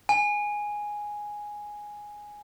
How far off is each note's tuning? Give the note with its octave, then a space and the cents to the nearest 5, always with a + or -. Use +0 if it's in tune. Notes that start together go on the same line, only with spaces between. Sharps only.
G#5 +0